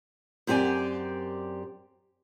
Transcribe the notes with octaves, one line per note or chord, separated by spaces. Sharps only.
F#2 C4 G4 D5 G#5